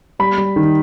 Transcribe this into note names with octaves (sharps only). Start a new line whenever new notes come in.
G3 B5
G3
D#3